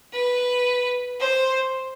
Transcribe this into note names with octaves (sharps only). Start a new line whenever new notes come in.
B4
C5